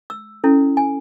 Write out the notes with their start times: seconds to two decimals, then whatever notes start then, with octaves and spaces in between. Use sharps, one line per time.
0.10 E6
0.44 C#4 E4 A4
0.77 G#5